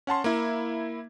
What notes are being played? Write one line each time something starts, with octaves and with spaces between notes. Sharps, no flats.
C#4 F#5 A5 C6
A#3 E4